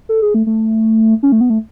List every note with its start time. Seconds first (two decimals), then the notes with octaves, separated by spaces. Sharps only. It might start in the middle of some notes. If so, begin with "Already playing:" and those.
0.09 A4
0.22 G#4
0.34 A3
0.47 A3
1.23 C#4
1.32 A3
1.41 B3
1.50 A3